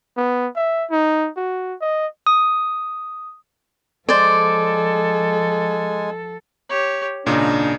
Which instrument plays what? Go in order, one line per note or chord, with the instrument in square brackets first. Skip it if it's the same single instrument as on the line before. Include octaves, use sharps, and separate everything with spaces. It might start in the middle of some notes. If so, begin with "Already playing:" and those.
[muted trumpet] B3
E5
D#4
F#4
D#5
[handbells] D#6
[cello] F3 A4 [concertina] G#3 G#5 [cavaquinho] C5 D5
[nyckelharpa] G4 C#5
[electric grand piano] G#1 A#2 C#3 [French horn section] D4 [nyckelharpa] D#4